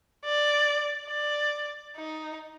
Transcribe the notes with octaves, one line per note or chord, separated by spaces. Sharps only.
D5
D5
D#4